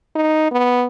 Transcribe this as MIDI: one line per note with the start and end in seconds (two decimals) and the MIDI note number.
0.16 0.50 63
0.52 0.87 59